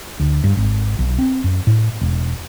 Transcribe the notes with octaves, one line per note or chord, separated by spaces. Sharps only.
D2
G2
G#1
B1
C4
F#2
A2
E1